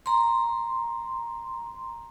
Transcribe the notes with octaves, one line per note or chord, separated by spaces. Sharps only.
A#5 C6